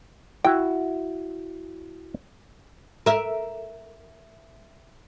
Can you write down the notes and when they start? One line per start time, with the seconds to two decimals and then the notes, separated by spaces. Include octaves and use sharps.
0.45 E4 F#4 G5
3.06 A#4 E5